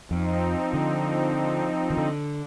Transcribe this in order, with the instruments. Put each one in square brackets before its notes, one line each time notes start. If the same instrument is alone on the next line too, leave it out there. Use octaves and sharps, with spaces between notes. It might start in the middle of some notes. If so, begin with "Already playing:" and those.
[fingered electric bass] F2 [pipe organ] F3 C4 D#4
[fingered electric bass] D3
D#3
D3